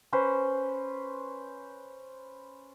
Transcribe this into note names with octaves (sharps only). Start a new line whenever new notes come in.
C#4 B4 C5